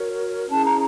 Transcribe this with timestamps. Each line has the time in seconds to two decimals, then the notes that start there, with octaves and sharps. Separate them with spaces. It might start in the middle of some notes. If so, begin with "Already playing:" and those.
Already playing: F#4 A#4 C#5
0.49 C#4 E4 G#4 A5
0.65 A#5